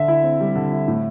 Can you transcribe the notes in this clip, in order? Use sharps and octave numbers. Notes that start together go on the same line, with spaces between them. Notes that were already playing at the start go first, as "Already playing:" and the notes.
Already playing: D3 E5
E4
C4
G3
D3
E4
A2